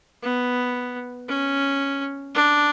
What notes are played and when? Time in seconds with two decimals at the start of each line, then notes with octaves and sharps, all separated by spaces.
0.23 B3
1.28 C#4
2.35 D4